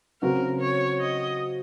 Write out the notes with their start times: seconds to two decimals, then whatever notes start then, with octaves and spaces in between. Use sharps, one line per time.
0.22 C#3 F#3 C4 F#4 A#4
0.61 C#5
1.01 D#5